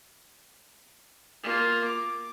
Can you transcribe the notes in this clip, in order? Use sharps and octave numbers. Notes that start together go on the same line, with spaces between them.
A#3 F4
D6